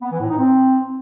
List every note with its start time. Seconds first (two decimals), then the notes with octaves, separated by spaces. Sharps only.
0.02 B3
0.11 E3
0.20 A2
0.29 D#4
0.38 C4